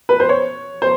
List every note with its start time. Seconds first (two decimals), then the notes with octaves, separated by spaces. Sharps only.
0.09 B4
0.20 C5
0.29 C#5
0.82 C5